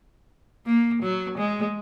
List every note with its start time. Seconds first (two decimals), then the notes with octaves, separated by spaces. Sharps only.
0.67 A#3
1.02 F#3
1.38 G#3